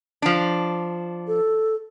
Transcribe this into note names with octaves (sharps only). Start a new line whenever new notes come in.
F3 D4
A4